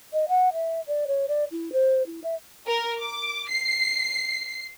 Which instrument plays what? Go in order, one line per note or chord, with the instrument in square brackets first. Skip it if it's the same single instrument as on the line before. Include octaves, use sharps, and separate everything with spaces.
[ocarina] D#5
F#5
E5
D5
C#5
D5
E4
C5
E4
E5
[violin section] A#4
D6
C7